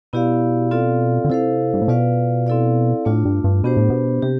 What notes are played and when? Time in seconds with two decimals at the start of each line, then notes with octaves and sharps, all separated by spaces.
0.13 B2 B3 E4 G4 D5 F5
0.71 C4 F4 A4 D5 F5
1.25 D3
1.30 C3 E4 A4 C5 F5
1.74 G2
1.82 A2
1.88 B2 F4 B4 D5 F5
2.47 C4 E4 A4 D5 F5
3.05 A2 A3 D4 F4
3.25 G2
3.44 G2
3.64 B2 B3 D4 G4 C5
3.77 A2
3.90 B2
4.23 C3 G4